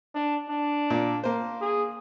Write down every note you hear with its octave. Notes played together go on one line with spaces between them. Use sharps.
D4
D4
A#2
A#3 C5
G#4